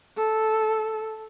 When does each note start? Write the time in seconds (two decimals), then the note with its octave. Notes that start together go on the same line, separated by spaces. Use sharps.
0.17 A4